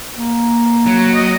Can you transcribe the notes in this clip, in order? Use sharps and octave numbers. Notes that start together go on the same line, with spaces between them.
A#3
F#3
D#5